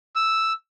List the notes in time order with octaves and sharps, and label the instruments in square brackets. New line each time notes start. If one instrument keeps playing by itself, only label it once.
[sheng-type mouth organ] E6